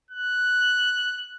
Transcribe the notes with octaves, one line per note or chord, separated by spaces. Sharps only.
F#6